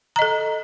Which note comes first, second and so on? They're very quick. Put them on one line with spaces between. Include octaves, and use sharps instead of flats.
A#5 D#5 A4